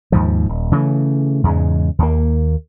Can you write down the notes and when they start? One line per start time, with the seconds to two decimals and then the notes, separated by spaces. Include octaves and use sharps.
0.12 D#2 G#2 F3
0.49 D#1
0.72 C#3 E3 G#3 A3
1.44 E2 G#2 C#3 G#3
1.99 D#2 A#3